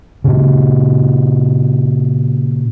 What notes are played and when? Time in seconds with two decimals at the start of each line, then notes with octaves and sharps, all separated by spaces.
0.24 A#2 C#3